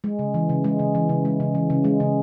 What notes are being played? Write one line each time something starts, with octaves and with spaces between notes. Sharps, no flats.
G#3
C#3
E3
C#3
G#3
C#3
E3
C#3
G#3
C#3
E3
C#3
G#3
C#3